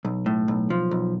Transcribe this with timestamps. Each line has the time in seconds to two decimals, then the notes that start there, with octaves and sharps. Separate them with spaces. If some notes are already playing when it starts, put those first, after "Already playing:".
0.05 B1
0.26 A2
0.48 B1
0.70 F3
0.91 B1